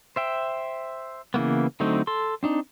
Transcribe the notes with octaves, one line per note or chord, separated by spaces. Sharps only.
C5 E5 G5
C#3 E3 A#3 B3
D3 F#3 A3 C4 D#4
A4 C6
C4 D4 D#4